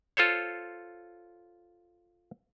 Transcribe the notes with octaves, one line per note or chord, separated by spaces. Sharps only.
F4 A4 C5 C#5